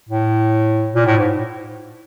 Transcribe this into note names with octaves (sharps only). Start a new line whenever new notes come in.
A2
A#2
A2
G#2